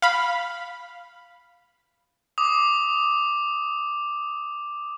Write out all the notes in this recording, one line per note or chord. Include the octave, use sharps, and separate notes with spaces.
F5 B5
D6 D#6